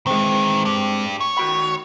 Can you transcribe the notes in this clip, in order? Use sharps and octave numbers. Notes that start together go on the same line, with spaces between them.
D#3 E3 G#3 C4
D4 G4
C#5
D#3 F#4 B5